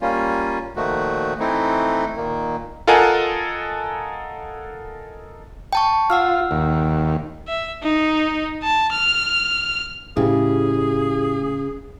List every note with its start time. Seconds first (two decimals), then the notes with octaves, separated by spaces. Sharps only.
0.01 G3 A#3 C#4 F4
0.76 A#2 D#3 F3 A3 F#4
1.40 E3 A3 C4 D#4 E4
2.16 A#2 D#3 A#3
2.87 F4 A4 A#4 D#5 F#5 G#5
5.73 G5 A5 C#6
6.10 F4 F#5 E6 F6
6.51 D#2
7.48 E5
7.83 D#4
8.63 A5
8.93 F6
10.17 A2 C#3 E4 G4 G#4